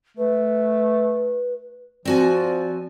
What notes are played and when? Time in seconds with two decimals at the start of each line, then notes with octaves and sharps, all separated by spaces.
0.17 A3 B4
2.05 F3 C4 F#4 D5 G#5